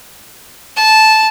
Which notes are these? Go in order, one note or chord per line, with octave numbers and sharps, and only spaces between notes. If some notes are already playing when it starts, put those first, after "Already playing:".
A5